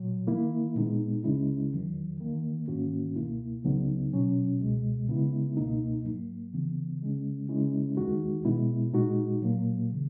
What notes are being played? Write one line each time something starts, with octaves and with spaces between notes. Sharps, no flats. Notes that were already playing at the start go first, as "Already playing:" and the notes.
Already playing: A#2 F#3
D#3 A#3 E4
A#2 G#3 B3 D#4
C#2 C#3 G#3 C#4 E4
E2 D#3 F#3
D#2 D#3 A#3
G#2 D#3 A#3 C#4 F#4
C#2 B2 A#3 E4
C#2 C#3 F#3 B3 D#4
B2 F#3 C#4
C#2 B2 G#3
C#3 G#3 B3 E4
C#2 B2 A#3 D#4
G#2 F#3 A#3
D#2 C#3 E3 B3
C#3 G#3 C#4
C#3 G#3 C#4 E4
D#2 D#3 G#3 D#4 F#4
B2 G#3 B3 E4
A#2 G#3 D#4 F#4
A#2 F#3 A#3
C#3 E3